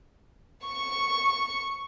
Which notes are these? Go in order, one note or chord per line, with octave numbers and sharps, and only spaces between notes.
C#6